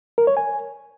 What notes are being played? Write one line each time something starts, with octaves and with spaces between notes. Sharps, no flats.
A#4
C#5
G#5